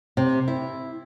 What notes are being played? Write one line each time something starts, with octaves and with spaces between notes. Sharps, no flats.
C3
E4